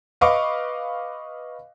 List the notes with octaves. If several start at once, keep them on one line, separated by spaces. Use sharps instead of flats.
B4 D#5 F5 C#6 D6